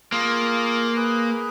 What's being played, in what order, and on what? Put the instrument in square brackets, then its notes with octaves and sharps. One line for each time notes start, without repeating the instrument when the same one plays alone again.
[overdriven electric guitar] A#3 [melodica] F4 G#4
[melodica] G#4 B4